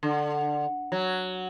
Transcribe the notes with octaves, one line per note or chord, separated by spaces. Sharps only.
D3
F#3